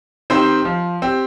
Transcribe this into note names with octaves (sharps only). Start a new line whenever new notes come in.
D#3 C4 G4 C5
F3
C4 G4